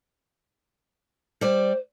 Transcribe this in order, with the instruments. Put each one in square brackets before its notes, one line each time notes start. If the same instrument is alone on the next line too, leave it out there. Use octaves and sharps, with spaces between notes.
[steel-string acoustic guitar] G3 D5 [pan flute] C5